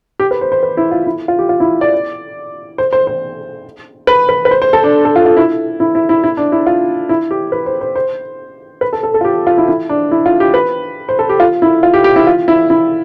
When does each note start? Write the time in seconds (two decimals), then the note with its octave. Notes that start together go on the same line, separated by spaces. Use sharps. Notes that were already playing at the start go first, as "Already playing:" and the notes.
0.20 G4
0.31 B4
0.41 C5
0.52 C5
0.63 B4
0.77 E4
0.92 F4
1.06 E4
1.28 F4
1.39 G4
1.49 F4
1.60 E4
1.81 D5
2.78 C5
2.93 C5
3.07 C5
4.07 B4
4.29 B4
4.45 B4
4.51 C5
4.62 C5
4.73 A4
4.84 D4
5.05 A4
5.16 F4
5.26 F4
5.37 E4
5.80 E4
5.95 E4
6.09 E4
6.24 E4
6.37 D4
6.52 E4
6.67 F4
7.09 E4
7.31 G4
7.52 B4
7.66 C5
7.81 C5
7.96 C5
8.81 B4
8.93 A4
9.03 A4
9.14 A4
9.21 F4
9.25 G4
9.47 F4
9.58 E4
9.68 E4
9.89 D4
10.11 E4
10.26 F4
10.40 G4
10.54 B4
11.09 C5
11.19 A4
11.29 G4
11.40 F4
11.62 E4
11.83 F4
11.94 G4
12.04 G4
12.16 E4
12.27 F4
12.48 E4
12.70 E4